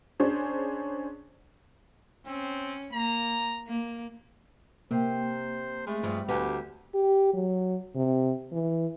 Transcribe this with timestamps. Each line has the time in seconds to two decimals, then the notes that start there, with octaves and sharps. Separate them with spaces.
0.20 C#4 D4 G#4 C5
2.26 C4 C#4
2.93 A#3 A#5
3.68 A#3
4.91 C3 A#3 C5
5.87 G#3 A3
6.03 G2 F3
6.28 D2 B3 G4
6.94 G4
7.33 F#3
7.95 C3
8.52 E3